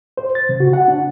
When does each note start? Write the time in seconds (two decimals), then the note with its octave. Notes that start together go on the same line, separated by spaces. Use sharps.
0.17 C5
0.35 A6
0.49 C#3
0.60 F#4
0.73 F#5
0.88 D4